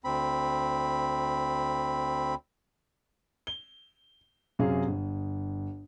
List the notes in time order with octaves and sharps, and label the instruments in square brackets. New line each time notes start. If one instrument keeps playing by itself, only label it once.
[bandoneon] D2 C4 B5
[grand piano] G7
F#2 C3 F#3 G#4 F5
G1